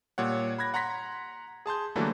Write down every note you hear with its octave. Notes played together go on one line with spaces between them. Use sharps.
A#2 G3 C#5 F#5
B5 F#6 G#6 A#6
F#5 A#5 C6 A#6 B6
G#4 A5 C6 G6
D3 E3 F#3 G3 A3 A#3